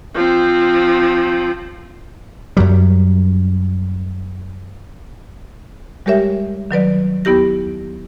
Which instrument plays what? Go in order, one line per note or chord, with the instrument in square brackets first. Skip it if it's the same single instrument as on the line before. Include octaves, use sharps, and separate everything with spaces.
[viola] F3 C4
[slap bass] F#2 F#3 G3
[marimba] G3 G#3 G4 A#4 C#5 E5
D#3 F#3 B4 D5
D#2 B3 E4 G4 A#6